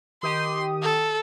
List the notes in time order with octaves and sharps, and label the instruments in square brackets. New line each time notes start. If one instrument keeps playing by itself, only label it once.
[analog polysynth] D#3 G4 D#6 [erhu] C6
[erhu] A4